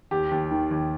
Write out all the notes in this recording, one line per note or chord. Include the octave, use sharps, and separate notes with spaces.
D#2 G4
D#2
D#3
D#2